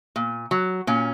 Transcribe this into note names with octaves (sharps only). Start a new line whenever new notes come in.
A#2
F#3
A#2 C#4